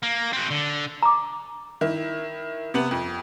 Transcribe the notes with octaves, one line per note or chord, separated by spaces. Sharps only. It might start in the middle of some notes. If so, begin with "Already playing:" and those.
A#3
C4 F#4
D3
A#5 D6
D#3 E4
C3 B3 F#7
F2